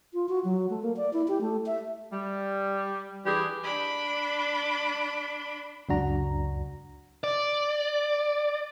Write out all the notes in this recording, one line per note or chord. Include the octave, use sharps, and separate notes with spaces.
F4
F#4
F#3
A3
A#3
D5
E4
G4
A3
E5
G3
E3 G3 D4 G4 G#4
D4 B5
C#2 F#2 D4 F#4 A#5
D5